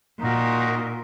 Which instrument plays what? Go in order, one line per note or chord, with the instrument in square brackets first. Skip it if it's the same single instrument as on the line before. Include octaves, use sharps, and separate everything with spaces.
[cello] A#2 [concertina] D#4 F#4 A#4